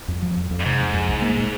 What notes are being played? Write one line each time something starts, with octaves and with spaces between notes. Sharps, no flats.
F2
F3
F2
F2
G2
G#2 C3
F2
F2
C2
A#3
A#2